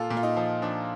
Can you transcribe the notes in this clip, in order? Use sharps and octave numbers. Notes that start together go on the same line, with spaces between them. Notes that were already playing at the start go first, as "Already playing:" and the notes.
Already playing: A#2 F4 A4
A#2
F4
D#4
F3
F3 D4